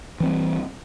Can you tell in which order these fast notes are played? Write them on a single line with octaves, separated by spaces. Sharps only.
E3 C4 G3